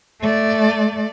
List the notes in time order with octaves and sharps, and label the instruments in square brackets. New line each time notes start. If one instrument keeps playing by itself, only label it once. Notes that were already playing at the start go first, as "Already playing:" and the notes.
[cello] A3 D5